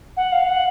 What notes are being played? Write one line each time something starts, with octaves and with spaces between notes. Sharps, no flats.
F#5
F5
F#5